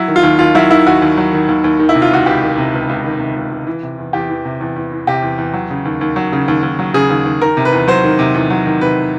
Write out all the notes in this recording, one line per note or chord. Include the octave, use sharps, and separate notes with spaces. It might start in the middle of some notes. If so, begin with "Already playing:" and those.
Already playing: F#3 E4
D#3
F4
D#2
D#2 F4
F#3 E4
D#3 E4
D#2 F#4
D#2
F#3
D#3
D#2
D#2
D#3
E4
C3
F4
C#2 F#4
C#2 G4
D#3
C3
C#2
C#2
D#3
C3
C#2
C#2
E3
C3
E2
E2 G4
E3
C3
E2
E2
E3
C3 G4
E2
E2
F#3
C#3
D#2
D#2
F#3
C#3
D#2
D#2
F#3
C#3 G#4
D#2
D#2
D#3 A#4
C3
B4
E2
F#3 C5
D#3
C3
E2
F#3
D#3
C3 B4